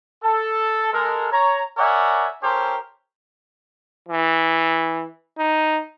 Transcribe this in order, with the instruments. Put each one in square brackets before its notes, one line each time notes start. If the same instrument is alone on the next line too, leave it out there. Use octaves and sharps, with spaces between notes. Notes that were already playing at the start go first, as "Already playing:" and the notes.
[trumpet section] A4
G#3 A4 A#4
C#5 A#5
A#4 C#5 D5 E5 F#5 G#5
C#4 G4 A4 A#4 C5
[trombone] E3
D#4